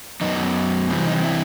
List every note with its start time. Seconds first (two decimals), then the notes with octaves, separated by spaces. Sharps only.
0.21 F#2 F#3 B3 D#4
0.89 C3 E3 G3 C4
1.07 D#4
1.23 E4